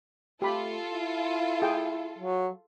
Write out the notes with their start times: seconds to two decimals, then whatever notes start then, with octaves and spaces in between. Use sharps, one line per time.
0.42 A3 F4 G4 A4 B5
0.93 E4
1.62 G#4 G5
2.19 F#3